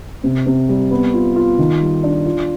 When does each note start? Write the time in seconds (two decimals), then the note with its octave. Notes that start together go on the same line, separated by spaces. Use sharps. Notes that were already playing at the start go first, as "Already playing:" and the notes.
0.24 C3
0.46 C3
0.69 G3
0.91 B3
1.14 F4
1.36 F4
1.59 D#3
1.81 G3
2.03 D4
2.26 F4